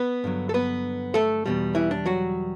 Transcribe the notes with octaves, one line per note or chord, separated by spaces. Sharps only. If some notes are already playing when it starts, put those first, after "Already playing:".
Already playing: B3 B4
G2 D3 F#3
A4
B3 B4
A3 A4
E2 B2 G3
E3 E4
D4
F#3 F#4